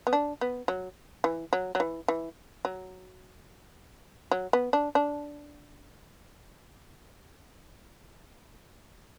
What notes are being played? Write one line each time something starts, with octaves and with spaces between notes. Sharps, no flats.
B3
D4
B3
F#3
E3
F#3
F#3
E3
E3
F#3
F#3
B3
D4
D4